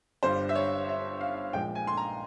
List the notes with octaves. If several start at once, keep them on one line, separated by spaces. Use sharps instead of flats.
G1 G2 G3 C5
E5
C#5
E5
F5
A#1 A#2 G#3 G5
G#5
C6
A#5